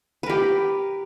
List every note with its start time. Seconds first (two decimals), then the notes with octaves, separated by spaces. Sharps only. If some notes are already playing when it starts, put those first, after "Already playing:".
0.23 B4
0.26 A#4
0.30 G4